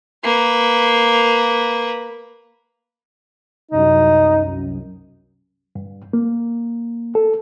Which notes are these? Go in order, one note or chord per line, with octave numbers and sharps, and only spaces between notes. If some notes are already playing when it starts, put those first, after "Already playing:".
A#3 B4
C2 F#2 D#4
G2
A#3
A4